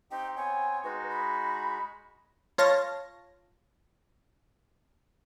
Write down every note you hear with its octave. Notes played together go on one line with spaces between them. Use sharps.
C4 D#4 G4 G5
B3 C4 C#5 G#5
G#3 D#4 F#4 B4
B5
F4 C#5 F5 A5 A#6